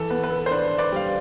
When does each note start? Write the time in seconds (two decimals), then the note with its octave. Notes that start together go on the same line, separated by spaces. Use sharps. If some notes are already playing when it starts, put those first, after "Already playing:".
Already playing: E3 A4
0.10 B3 B4
0.23 B4
0.31 A4
0.46 C5
0.51 D4 B4
0.78 B4 D5
0.92 G3 F5